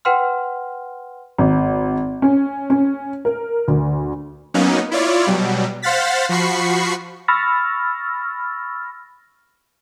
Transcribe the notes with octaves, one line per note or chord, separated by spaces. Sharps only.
B4 F#5 G5 C6 F6
G#1
C#4
C#4
A#4
D2
F#3 A#3 B3 C#4 D#4
E4 F4 C#5 D5
B2 F#3 G3
C5 F5 F#5 A6 B6
F3 F#4 B5 C#6 C7
B5 C#6 E6 F6 A6 A#6